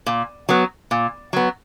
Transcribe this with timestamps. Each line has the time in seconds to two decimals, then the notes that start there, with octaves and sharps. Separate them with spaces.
0.06 A#2
0.49 F#3 B3
0.91 A#2
1.33 F#3 B3